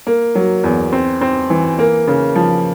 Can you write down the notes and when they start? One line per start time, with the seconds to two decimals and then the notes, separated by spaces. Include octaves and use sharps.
0.07 A#3
0.35 F#3
0.64 E2
0.92 C4
1.21 C4
1.50 E3
1.79 A#3
2.08 C#3
2.35 F3